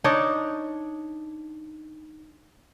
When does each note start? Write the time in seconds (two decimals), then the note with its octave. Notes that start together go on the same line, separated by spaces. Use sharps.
0.04 D4 D#4 C#5 D5